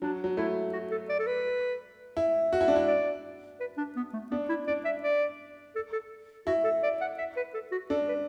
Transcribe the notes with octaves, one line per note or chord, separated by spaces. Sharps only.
F#3 D4
F#3
A3 E4
F#4
A4
D5
A4
B4
E4
F#4
E4
D4
E4
D5
B4
D4
B3
A3
B3 D4
E4
D4 D5
E5
D5
A4
A4
E4 F#4
A4
D5
F#5
E5
B4
A4
F#4
D4 A4
B4